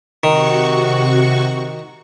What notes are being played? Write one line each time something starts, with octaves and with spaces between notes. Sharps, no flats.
C3 D#3 F#4 C#6